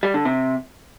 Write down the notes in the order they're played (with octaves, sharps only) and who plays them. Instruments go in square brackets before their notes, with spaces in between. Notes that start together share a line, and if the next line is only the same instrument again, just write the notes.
[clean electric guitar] G3
D3
C3